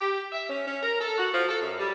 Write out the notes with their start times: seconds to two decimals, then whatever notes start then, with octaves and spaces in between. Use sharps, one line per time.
0.01 G4
0.32 E5
0.50 C#4
0.67 C#4
0.83 A#4
1.01 A4
1.18 F#4
1.34 F3
1.49 A4
1.62 F#2
1.79 G3